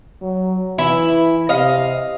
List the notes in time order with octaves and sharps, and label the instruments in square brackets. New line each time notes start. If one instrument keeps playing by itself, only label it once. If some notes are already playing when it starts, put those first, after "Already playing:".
[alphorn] F#3
[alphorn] E3 [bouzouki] E4
[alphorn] C3 [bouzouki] D#5 F5